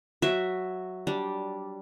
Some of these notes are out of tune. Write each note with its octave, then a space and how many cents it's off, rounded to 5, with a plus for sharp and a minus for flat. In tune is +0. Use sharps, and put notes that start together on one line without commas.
F#3 +0 F#4 +0 E5 +0
G3 -10 D4 +0